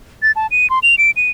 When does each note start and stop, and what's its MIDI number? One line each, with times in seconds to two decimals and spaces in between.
0.23 0.32 93
0.36 0.47 81
0.51 0.69 99
0.70 0.79 84
0.83 0.95 101
0.98 1.11 98
1.17 1.31 99